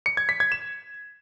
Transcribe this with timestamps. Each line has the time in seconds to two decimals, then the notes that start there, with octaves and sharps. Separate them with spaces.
0.06 C#7
0.17 G#6
0.29 B6
0.40 G#6
0.52 E7